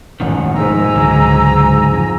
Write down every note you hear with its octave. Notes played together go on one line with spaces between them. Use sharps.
E1 A1 F#2 D#3 F#5
A#1 G#2 C3 F3 G#5 A#5 E6
C#2 D3 F#3 G#3
F2